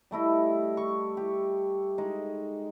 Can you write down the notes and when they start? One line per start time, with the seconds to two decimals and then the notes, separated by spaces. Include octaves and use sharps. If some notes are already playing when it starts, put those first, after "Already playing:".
0.11 G3 A3 E4 D#5
0.77 C#6
1.17 G4
1.98 G#3 D#4